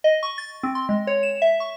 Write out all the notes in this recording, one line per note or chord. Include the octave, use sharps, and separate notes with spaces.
D#5
C#6
A6
C4
C6
G#3
C#5
E7
E5
C#6